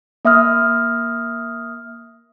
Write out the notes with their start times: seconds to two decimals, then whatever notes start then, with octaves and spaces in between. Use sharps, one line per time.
0.25 A#3 E5 D#6 F6